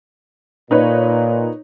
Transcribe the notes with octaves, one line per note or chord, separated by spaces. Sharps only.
A#2 D#4 B4 C#5